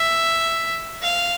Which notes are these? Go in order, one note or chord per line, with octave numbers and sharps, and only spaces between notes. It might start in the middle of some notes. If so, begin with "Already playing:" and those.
Already playing: E5
F5